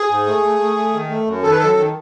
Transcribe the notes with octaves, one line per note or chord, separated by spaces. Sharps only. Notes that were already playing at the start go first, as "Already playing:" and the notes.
Already playing: G#4
G#2
A3
A3
A3
A3
D#3
A3
F#2
D#3 A4
B4
F#2 A4
D#3